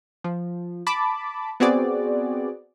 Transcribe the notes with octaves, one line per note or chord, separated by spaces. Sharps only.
F3
A5 B5 D6
B3 C4 F#4 G#4 D5